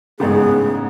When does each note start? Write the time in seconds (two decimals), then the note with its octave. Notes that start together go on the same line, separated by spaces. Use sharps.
0.20 A1 G#2 C#3 G#3 B3 G#4